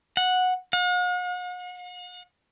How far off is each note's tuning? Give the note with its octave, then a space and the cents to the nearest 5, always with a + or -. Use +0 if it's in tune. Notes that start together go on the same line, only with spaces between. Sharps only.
F#5 -10
F#5 -45